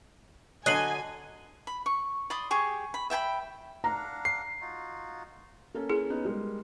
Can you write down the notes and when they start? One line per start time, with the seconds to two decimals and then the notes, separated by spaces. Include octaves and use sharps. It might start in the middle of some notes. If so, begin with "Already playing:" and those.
0.66 D3 F#3 D#5 G#5 F#6 C7 F#7
1.67 B5
1.86 C#6
2.30 D5 B5 C6 D#6
2.51 G4 G#4 C#6
2.94 B5
3.10 E5 G5 G#5 B5
3.84 D4 F5 F#5 A#5
4.25 C7
4.61 D#4 F4 F#4
5.74 A#3 C#4 A4
5.89 E4 G#4
6.10 B3 C#4 D#4
6.25 G3 G#3 A#4